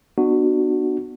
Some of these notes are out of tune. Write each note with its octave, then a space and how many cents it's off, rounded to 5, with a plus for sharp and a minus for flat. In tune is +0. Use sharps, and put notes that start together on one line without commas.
B3 +0 D4 +35 F#4 +0